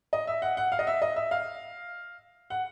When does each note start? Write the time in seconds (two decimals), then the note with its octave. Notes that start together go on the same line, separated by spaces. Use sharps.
0.13 D#5
0.27 E5
0.42 F#5
0.57 F#5
0.72 F5
0.79 D#5
0.87 E5
1.02 D#5
1.16 E5
1.31 F5
2.50 F#5